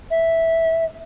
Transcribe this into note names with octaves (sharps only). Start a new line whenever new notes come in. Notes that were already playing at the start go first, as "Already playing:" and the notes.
E5